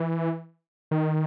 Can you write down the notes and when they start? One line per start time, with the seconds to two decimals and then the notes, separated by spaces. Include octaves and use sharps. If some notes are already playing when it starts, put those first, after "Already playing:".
Already playing: E3
0.91 D#3